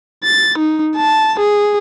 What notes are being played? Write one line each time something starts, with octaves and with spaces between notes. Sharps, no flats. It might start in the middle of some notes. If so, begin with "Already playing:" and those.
A6
D#4
A5
G#4